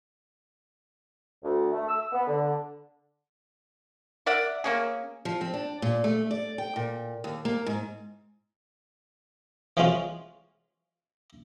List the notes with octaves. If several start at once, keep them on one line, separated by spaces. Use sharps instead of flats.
D2
A3
E6
B3
D3
A#4 D5 E5 F#5
A#3 C#4 G#4
F3
C4
D4
A#2
A3
D5
G5
A#2
D#2
A#3
G#2
E3 F3 G#3 C#4 F4 F#4